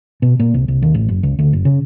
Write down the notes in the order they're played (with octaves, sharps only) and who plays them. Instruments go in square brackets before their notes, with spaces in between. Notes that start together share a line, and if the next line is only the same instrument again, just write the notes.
[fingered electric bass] B2
A#2
C2
C2
D#2
A1
F#1
C#2
D2
F#1
C#3